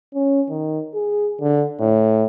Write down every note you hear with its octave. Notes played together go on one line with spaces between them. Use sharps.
C#4
D#3
G#4
D3
A2